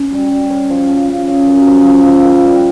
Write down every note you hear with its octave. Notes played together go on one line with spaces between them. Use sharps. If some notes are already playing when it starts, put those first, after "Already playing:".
Already playing: C#4
G3
G3
C#4
F3
C#3
C#3
C#3
F#2
F3
F3
F3
D#3
G3